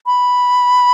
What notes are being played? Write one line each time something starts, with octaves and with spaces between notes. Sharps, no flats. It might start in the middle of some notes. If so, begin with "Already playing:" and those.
B5